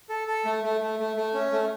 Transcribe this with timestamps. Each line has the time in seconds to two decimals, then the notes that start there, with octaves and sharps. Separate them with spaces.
0.09 A4
0.27 A4
0.45 A3
0.64 A3
0.81 A3
0.99 A3
1.17 A3
1.34 C#4
1.52 A3